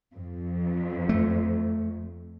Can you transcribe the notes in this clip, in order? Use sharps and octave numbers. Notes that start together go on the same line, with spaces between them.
F2
A3